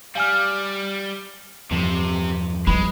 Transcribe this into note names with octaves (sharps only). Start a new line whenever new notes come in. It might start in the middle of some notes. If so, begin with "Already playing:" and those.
G3 F5 G#5 F6
E2 G2 C3 F3
E3 G3 G#3 B5